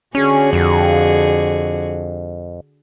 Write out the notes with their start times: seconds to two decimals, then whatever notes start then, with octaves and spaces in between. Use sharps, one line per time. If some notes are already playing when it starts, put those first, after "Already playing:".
0.15 D3 C#4 F#4 G#4
0.53 F2